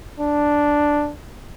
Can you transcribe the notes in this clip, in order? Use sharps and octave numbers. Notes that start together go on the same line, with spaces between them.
D4